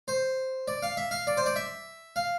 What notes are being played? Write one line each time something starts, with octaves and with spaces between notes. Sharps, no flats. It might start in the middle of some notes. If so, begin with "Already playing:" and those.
C5
D5
F5
E5
F5
D5
C5
D5
E5
F5